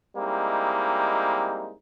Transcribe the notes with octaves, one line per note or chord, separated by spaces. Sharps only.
G3 G#3 A#3 C4 D#4 E4